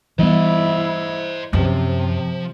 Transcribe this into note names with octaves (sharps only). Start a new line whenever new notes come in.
E3 G3 B3 E4 C5 D#5
F#2 C3 F3